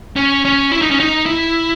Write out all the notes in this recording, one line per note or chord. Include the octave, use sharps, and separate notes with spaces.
C#4
C#4
E4
D#4
C#4
D#4
E4